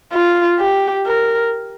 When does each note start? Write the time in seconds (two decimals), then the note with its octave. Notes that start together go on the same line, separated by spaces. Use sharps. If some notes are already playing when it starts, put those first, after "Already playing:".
0.13 F4
0.59 G4
1.07 A#4